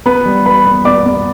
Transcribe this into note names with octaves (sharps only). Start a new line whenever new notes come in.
B3 B4 B5
G3
G3 B4 B5
B3
B3 D5 D6
B3